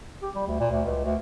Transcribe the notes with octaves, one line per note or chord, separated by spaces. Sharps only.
G4
G3
D2
A#2
D2
C#2
D2